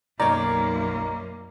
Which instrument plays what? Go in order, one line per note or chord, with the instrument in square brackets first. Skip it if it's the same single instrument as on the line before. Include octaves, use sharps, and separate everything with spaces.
[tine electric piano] B1 D#4 A#4 [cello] F#2 A#3 [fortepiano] C#5 D5 [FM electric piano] A#5